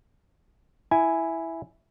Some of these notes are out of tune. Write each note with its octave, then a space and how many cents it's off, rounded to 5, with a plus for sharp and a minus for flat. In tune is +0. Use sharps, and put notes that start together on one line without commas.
E4 +0 G#5 +0